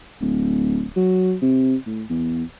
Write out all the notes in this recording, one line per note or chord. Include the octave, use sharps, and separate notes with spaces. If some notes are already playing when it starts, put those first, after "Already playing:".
D1
F#3
C3
A2
E2